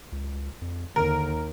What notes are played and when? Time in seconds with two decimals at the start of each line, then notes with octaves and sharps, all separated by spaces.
0.12 C#2
0.62 F2
0.96 D#2 D3 A#4